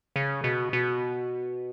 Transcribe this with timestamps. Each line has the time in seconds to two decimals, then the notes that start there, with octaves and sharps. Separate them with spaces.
0.16 C#3
0.44 B2
0.73 B2